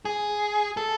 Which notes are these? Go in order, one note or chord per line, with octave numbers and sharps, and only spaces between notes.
G#4
A4